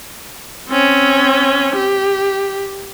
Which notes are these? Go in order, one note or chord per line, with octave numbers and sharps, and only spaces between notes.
C4 C#4
G4